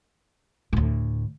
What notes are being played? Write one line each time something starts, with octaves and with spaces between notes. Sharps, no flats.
D2 A2